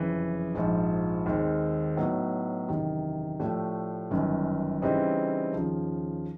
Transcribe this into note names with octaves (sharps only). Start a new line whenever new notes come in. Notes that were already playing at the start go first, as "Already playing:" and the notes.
Already playing: F#1 F2 C#3 E3
A#1 G#2 F3
D#2 D#3 G#3 C4
A2 F#3 B3 D#4
F#1 E2 C3 D#3
A2 F3 A3 D4 G4
G1 F#2 D#3
C#3 E3 G3 C4 D#4
D#2 C#3 F3